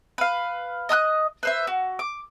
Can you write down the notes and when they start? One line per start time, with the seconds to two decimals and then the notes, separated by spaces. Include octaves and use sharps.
0.18 B4 F5
0.89 D#5 D#6 E6 F#6
1.43 B4 C5 E5
1.67 F#4
1.99 D6